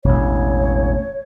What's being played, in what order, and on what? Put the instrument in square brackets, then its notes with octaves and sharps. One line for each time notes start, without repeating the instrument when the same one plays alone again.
[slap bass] E1 A1 [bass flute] C#5